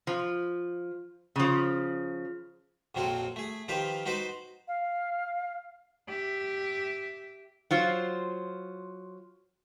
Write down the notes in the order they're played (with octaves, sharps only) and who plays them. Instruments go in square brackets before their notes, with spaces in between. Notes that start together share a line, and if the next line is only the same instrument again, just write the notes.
[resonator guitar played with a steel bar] F3
C#3 F3
[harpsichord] A#1 F2 F#3 C4 F#4 A4
A3 G#4
D#3 F3 G4 B4 C5
D#4 F#4 B4 C5 C6 D6
[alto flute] F5
[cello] G4 E5
[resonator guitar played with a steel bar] F#3 F4 C5